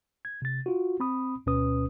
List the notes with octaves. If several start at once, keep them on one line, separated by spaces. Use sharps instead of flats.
G#6
C3 A6
F4 F#4
C4 B5 D#6
D2 B2 C#4 B4 D#6